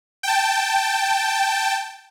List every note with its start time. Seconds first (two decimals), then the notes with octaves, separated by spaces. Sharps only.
0.23 G5 A5